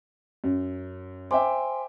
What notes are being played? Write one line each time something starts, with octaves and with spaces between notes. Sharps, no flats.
F#2
C5 E5 G5 G#5 C6 D6